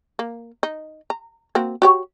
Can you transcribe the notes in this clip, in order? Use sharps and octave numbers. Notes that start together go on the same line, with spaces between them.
A#3
D#4
A#5
A#3 C4 F#4
F#4 G4 C#5